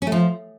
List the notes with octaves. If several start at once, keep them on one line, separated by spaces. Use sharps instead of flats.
C#4
A3
F3